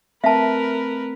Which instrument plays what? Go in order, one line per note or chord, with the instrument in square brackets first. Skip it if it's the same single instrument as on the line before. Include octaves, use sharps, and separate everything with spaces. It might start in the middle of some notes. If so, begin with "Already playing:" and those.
[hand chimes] A3 C4 B6 [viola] A#4 B4 [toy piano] E5 A5